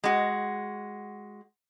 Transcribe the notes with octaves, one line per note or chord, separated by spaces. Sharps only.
G#3 F#4